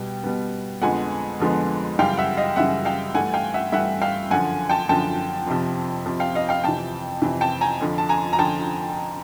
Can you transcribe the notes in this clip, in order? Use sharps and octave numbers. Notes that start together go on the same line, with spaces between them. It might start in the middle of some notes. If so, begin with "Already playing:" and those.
Already playing: B2 G3 B3 G5
B2 G3 B3
F2 D3 F3 G#3 B3 F#5 G#5
F2 D3 F3 G#3 B3
F#2 C#3 E3 G3 F5 G5
E5 F#5
D#5 F5
F#2 C#3 E3 G3 E5 F#5
F5 G5
G2 E3 A3 F#5 G#5
F5 G5
E5 F#5
G2 E3 A3 E5 F#5
F5 G5
F#2 D3 F3 F#5 G#5
G5 A5
F#2 D3 F3 G5 A5
F2 C3 F3
F2 C3 F3
F5 G5
D#5 F5
F5 G5
F2 C3 E3 G5 A5
F2 C3 E3
G5 A5
G#5 A#5
F2 D3 F3
A5
G#5 A#5
A#5
D3 F3 G5 A5